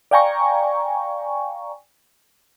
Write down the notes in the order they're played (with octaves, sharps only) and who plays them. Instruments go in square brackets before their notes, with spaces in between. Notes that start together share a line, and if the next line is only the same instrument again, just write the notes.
[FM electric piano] D5 F5 G5 G#5 A#5 C#6